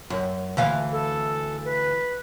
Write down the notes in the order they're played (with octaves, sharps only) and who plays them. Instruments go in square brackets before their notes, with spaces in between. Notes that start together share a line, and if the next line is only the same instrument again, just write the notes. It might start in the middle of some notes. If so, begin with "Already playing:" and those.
[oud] F#2
D2 E3 F5
[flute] A4
B4